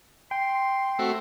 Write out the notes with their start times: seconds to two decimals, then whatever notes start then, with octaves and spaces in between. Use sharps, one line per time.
0.31 G5 C6
0.99 A3 C4 F#4 E5